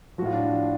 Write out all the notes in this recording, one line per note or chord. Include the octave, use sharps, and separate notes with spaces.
A2 F3 F4 F#4
D4
F4